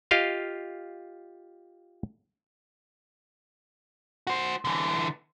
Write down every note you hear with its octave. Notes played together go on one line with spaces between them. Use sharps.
F4 G4 D#5 F5
F#4 C5
D3 E3